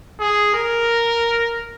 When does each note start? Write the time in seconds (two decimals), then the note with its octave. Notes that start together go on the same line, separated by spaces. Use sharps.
0.20 G#4
0.54 A#4